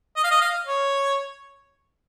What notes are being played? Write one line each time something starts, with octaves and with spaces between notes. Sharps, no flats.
D#5
F5
D#5
F5
C#5